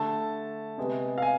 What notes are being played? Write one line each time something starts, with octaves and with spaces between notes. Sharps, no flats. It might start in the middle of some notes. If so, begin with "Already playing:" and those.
Already playing: D3 A3 A5
C3 G#3 B3
F5
G#5